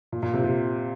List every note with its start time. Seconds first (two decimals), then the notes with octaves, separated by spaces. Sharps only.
0.12 A#2
0.23 A#2
0.34 C3
0.44 C3